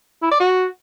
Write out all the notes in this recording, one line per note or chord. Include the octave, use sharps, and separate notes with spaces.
E4
D5
F#4